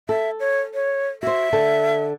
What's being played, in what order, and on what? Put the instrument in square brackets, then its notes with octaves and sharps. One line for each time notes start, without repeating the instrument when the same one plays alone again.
[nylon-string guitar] A4 [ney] E5
[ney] C#5
C#5
[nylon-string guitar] F#4 C5 [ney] E5
[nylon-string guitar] D3 A4 A5